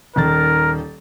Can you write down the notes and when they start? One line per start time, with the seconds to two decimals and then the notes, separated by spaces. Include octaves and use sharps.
0.16 D#1 D#3 A#4 A6